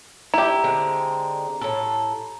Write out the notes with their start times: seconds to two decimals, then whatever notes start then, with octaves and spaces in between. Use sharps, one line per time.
0.34 E4 G4 A#5
0.64 D3 G#3 C4
1.61 A2 A4